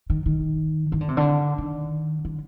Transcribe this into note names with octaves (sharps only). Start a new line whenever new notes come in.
D#3
D#3
D#3
D3
C3
D3
D#3
D3